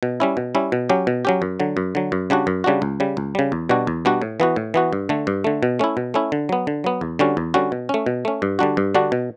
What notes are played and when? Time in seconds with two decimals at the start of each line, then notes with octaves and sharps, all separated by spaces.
0.03 B2
0.20 G3 C#4 E4
0.37 B2
0.55 G3 C#4 E4
0.72 B2
0.89 F#3 C#4 G4
1.07 B2
1.25 F#3 C#4 G4
1.42 F#2
1.60 D3 F#3
1.77 F#2
1.95 D3 F#3
2.12 F#2
2.30 C#3 G3 D4 F#4
2.47 F#2
2.64 C#3 G3 D4 F#4
2.82 C#2
3.00 C#3 G3
3.17 C#2
3.35 C#3 G3
3.52 E2
3.69 B2 G3 D4 F#4
3.87 E2
4.05 B2 G3 D4 F#4
4.22 A2
4.40 E3 B3 F#4
4.56 A2
4.74 E3 B3 F#4
4.93 G2
5.09 D3 A3
5.27 G2
5.44 D3 A3
5.63 B2
5.79 A3 C#4 E4
5.97 B2
6.14 A3 C#4 E4
6.32 D3
6.49 F#3 B3
6.67 D3
6.84 F#3 B3
7.01 E2
7.19 D3 G3 C#4 F#4
7.37 E2
7.54 D3 G3 C#4 F#4
7.72 B2
7.89 A3 C#4
8.06 B2
8.25 A3 C#4
8.42 G2
8.59 D3 G3 D4 F#4
8.77 G2
8.94 D3 G3 D4 F#4
9.12 B2